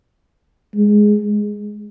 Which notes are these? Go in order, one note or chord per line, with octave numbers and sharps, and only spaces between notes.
G#3